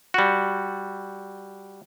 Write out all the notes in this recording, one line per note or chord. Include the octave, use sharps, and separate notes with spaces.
G3 F#4